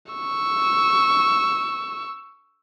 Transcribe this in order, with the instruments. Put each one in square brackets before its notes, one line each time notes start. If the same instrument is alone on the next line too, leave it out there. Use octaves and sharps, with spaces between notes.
[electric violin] C#6 E6